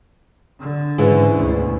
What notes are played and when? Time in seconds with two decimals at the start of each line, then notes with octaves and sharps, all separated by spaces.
0.60 D3
0.98 G#2 C#3 E3
1.36 D2 B2